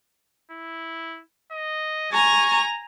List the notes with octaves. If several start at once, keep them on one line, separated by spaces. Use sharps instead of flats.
E4
D#5
G#5 A#5 C#6